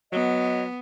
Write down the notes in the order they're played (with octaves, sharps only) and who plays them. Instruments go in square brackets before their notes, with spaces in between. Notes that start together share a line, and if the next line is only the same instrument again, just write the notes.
[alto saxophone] F#3 [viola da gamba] B3 [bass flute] D#5